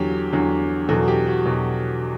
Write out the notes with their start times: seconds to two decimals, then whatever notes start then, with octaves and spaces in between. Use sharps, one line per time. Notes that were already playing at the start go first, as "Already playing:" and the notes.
Already playing: E2 D3 F#3 G4
0.32 E2 D3 F#3
0.89 E2 B2 F#3 A4
1.08 G4
1.27 F#4
1.46 E2 B2 F#3